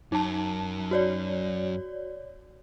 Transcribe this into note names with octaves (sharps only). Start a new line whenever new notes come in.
F#2 D#4 A5
F#4 C#5 D5